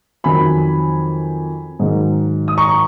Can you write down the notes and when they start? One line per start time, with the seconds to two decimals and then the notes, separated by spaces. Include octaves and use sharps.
0.24 F2 D#3 F#3 G#5 B5
1.79 G#2 D#3 F#3
2.48 D#6
2.57 A#5 C#6